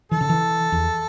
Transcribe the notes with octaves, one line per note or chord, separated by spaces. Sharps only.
E3 A4
C#3
E3
E2